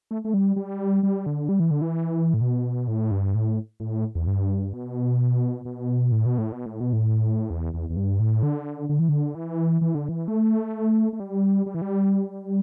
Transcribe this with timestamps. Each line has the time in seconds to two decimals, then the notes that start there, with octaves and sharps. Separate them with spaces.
0.11 A3
0.25 A3
0.34 G3
0.56 G3
1.03 G3
1.26 D3
1.49 G3
1.60 E3
1.71 D3
1.82 E3
2.34 A2
2.41 B2
2.88 A2
3.11 G2
3.35 A2
3.80 A2
4.15 E2
4.27 G2
4.73 B2
5.65 B2
6.12 A2
6.26 B2
6.38 A2
6.52 B2
6.66 A2
6.80 B2
6.93 A2
7.50 E2
7.74 E2
7.90 E2
7.97 G2
8.20 A2
8.43 D3
8.89 D3
8.99 E3
9.09 D3
9.35 E3
9.81 E3
9.95 D3
10.09 E3
10.28 A3
11.13 A3
11.20 G3
11.66 G3
11.74 E3
11.82 G3